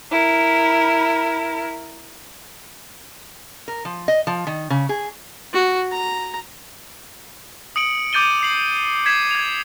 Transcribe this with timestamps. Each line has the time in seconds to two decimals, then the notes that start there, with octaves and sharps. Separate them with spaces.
0.12 E4 A#4
3.68 A#4
3.85 F3
4.08 D#5
4.27 F3
4.47 D#3
4.70 C#3
4.89 G#4
5.53 F#4
5.92 A#5
7.76 D#6 C#7 D7 F#7
8.13 D6 G6 A6 D#7 G7
8.43 C7 F#7
9.06 G#6 B6 C7 E7
9.31 G#6 F7